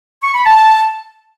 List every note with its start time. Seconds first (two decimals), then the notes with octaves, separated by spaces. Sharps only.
0.23 C#6
0.34 B5
0.46 A5